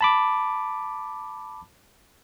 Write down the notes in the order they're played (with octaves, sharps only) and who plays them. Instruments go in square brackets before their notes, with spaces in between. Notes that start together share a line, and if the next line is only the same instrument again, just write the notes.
[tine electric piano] A5 B5 D6